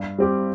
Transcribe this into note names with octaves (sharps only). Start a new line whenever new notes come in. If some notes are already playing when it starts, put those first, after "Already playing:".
Already playing: G2
G3 C4 G4